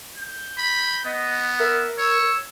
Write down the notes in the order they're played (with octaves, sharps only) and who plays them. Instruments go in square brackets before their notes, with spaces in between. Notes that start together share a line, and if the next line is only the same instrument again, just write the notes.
[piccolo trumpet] G6
[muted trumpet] B5
[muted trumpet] B3 [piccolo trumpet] D#5
[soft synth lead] A#4 [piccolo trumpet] E5
[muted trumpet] C#5 [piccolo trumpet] E6